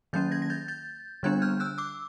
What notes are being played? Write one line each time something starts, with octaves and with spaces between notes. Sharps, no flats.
D#3 F#3 A#3 C#4 G6 A6
G#6 A#6
A#6
G6 A6
G6 A6
D3 G3 B3 D4 F#6 G#6
F6 G6
E6 F#6
D6 E6